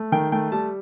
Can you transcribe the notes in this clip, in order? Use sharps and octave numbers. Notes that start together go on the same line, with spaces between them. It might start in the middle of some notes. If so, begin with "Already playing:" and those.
Already playing: A3
D#3 G5
A3 G5
G3 A5